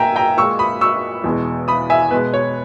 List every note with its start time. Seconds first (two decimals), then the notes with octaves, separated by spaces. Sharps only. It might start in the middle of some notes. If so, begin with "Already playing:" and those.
Already playing: A#2 A#3 E5 G5 G#5 A#5
0.16 G5 A#5
0.37 A#2 G#3 C#6 E6
0.59 B5 D#6
0.81 C#6 E6
1.24 E2 B2 G#3
1.68 B5 D#6
1.90 E5 G#5
2.11 B2 G#3 B4
2.34 C#5